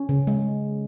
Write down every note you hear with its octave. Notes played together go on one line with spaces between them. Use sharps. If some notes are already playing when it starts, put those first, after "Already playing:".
Already playing: C#4
C#3
G#3